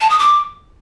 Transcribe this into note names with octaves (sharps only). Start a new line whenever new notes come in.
A5
D#6
D6